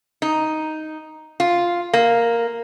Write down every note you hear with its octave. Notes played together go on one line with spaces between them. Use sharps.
D#4
F4
A#3